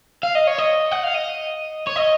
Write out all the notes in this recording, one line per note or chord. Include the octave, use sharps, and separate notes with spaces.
F5
D#5
C#5
D#5
F#5
F5
D#5
C#5
D#5